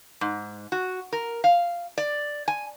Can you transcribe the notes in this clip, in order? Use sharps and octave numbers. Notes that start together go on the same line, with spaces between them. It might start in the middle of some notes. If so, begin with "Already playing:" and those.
G#2
F#4
A#4
F5
D5
G#5